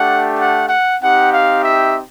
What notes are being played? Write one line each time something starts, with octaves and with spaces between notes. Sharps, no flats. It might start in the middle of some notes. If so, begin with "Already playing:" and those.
Already playing: A3 D4 G4 F#5
F#5
F#5
C4 D#4 G4 F#5
F5
E5